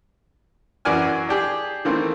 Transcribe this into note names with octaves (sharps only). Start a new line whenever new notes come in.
F#2 E3 F#4 D5 G#5 F6
D4 G4 G#4
D#3 E3 A3 A#3 C4